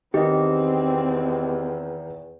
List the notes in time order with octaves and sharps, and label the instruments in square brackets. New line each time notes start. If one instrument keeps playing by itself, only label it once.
[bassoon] E2 [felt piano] D#3 [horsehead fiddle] C4 [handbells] G4 D#5